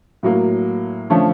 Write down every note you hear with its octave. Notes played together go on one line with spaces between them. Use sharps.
A2 F#3 A#3
D3 F3 A3 C#4